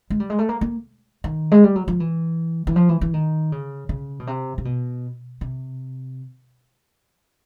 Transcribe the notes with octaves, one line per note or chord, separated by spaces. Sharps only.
G#3
G3
G#3
A3
A#3
A#3
D#3
G#3
G3
F#3
F3
E3
E3
F3
E3
E3
D#3
C#3
C#3
B2
C3
C3
B2
C3